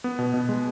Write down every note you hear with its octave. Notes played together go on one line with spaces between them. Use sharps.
B3
B2
B2
G#3